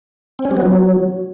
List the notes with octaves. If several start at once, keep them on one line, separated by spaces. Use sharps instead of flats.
C4
C#4
G3
B3
F#3